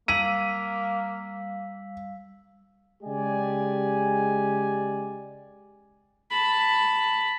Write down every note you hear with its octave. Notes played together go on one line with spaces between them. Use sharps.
G3 A#3 F5 E6 B6 D#7 F#7
C#3 G#3 G4 D5 G#5
A5 B5